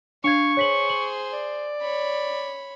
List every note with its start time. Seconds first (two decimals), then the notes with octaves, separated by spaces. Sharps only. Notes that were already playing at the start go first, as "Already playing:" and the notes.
0.24 D4 F5 C#6 G#6
0.57 G#4 C5 C#5 B6 F#7
0.89 F#7
1.33 D5
1.82 C#5 B5